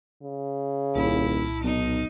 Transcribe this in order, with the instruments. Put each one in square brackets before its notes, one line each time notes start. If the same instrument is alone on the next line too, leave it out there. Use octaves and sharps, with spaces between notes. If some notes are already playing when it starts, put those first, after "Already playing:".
[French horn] C#3
[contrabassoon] D#1 [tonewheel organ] C2 A#2 A5 [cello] E4
[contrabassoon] B1 [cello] D#4